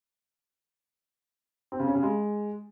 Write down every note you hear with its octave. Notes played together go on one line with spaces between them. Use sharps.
C4
C#3
C#4
C#3
G#3